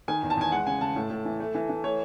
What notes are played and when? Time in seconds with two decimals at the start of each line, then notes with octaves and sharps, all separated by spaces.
0.08 D#3 G#5
0.23 E2
0.30 A5
0.37 E2 G#5
0.52 G#3 F#5
0.66 C#3 G#5
0.81 C#3 A5
0.96 A2
1.10 A2
1.25 E3
1.40 A3
1.55 E3
1.69 E3
1.83 A3 C#5